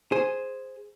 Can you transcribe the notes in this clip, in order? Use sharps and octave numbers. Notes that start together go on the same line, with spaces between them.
G#4 C5